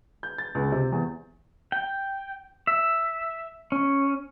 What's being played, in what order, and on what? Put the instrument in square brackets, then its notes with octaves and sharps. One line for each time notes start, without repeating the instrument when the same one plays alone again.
[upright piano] G6
A6
C#2
C3
E2
[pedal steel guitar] G5
E5
C#4